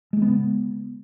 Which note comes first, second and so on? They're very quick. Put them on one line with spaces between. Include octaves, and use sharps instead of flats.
G#3 A#3 B3 C#3